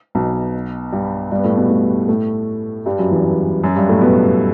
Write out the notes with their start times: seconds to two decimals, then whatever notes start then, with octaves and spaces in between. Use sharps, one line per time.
0.15 B1 B2
0.92 G2 G3
1.31 G2 G3
1.38 B3
1.44 A2 A3
1.57 B2 B3
1.69 A2 A3
2.08 A2 A3
2.86 G2 G3
2.98 F#2 F#3
3.11 E2 E3
3.63 F#2 F#3
3.76 G2 G3
3.89 A2 A3
4.01 B2 B3